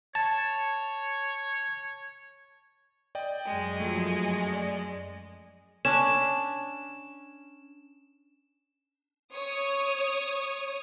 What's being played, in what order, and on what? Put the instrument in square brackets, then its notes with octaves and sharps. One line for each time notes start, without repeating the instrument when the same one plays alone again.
[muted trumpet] C#5 [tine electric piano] A5
[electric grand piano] D5 D#5 G5
[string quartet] F#2 G#3
[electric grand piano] F3 F#3 A3
D5
[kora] C#4 D4 [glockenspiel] E7
[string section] C#5 D#6